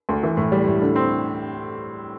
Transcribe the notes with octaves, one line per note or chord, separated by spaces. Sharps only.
D2
E3
A2
G3
A2
D3
C4